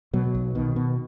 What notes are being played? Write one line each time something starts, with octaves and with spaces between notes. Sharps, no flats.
B2 F#3
B1
B2 D#3
B2